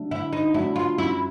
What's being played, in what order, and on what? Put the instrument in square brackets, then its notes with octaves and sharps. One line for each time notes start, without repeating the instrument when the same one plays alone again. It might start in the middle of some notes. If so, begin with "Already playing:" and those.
Already playing: [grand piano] D3 F#3 A3 D4
[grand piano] D3 [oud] E4
[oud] D#4
[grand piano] F#3 A3 D4 [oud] E4
[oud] F4
[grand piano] F#2 [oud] E4